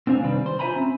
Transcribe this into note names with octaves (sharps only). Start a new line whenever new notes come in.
C4 D4 C5 F5 G#5
C3 D#3 G3 D4 B4
C5
F4 C5 E5 G#5 A#5 B5
C4 C#4